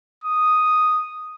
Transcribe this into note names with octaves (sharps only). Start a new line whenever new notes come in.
D#6